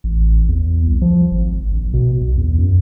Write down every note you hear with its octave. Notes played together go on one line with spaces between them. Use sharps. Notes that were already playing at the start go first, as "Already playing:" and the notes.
A1
E2
C2
F3
G#1
A#1
B2
B1
E2
F#2